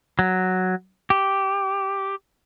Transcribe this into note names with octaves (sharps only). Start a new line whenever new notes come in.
F#3
G4